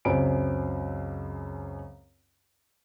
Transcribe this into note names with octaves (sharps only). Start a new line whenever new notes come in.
C#2 F#2 C4 B5 D7